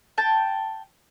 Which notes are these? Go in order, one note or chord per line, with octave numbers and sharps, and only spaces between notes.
G5 A5